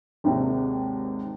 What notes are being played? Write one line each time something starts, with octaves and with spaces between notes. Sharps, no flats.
G#1 D#2 G#2 C3